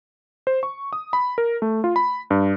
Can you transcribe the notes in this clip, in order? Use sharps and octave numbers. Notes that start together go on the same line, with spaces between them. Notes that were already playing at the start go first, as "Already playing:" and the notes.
C5
C#6
D#6
B5
A#4
A3
F4
B5
G2